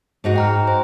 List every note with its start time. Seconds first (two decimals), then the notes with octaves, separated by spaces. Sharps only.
0.24 G#2 D#4 F#4
0.36 G5 A#5 F6
0.68 C5